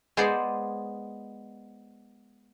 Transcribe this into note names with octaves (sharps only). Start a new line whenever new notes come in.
G#3 B3 G#4 C5 D5